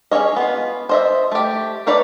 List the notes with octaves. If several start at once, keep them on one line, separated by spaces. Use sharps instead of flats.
C#4 G#4 A4 C#5 D#5
B3 F4
C5 D#5 E5
A3 G4
D4 D#4 B4 C#5 D5